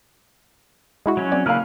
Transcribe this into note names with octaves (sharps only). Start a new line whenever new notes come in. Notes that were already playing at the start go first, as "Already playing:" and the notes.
G#3 E4 F#4
F#3 C#4
C4 D5
C#3 A#3 B4 F5 E6 F6